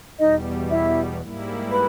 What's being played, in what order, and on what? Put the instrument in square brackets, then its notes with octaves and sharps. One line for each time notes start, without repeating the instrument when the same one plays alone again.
[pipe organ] E2 B2 G3 [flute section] D#4 D#5
[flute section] E4 E5
[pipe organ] G#2 G3 A#3 E4
[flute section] B4 B5